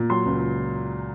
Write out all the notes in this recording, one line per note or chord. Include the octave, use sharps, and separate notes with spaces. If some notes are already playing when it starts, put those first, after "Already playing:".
Already playing: A#2
F#3 C6
C#2